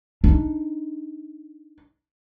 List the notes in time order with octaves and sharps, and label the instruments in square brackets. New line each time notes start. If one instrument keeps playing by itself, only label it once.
[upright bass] D4 D#4